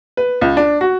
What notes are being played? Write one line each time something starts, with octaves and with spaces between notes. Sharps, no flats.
B4
C#2
D4
F#4